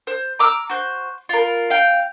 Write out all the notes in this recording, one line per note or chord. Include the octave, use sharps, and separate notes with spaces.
C5
A#5 D6 E6 F6
F#4 C5
F4 A#4
F5 G5